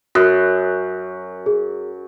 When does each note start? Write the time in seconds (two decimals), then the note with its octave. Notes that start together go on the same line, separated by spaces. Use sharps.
0.15 F#2 F#4 D#6 F#6
1.46 G#4